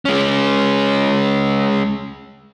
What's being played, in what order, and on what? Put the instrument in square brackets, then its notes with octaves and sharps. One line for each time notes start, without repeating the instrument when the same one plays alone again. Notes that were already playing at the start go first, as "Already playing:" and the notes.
[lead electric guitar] G#3 C#4